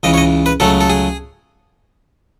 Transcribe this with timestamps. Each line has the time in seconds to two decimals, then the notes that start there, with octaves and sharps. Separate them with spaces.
0.03 C#2 C#3 E3 D#5
0.14 C#5
0.18 D#5
0.46 B4
0.60 C#2 C#3 F#3 A3 A4
0.81 A4
0.90 G#4